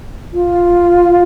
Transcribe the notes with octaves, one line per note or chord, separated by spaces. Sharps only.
F4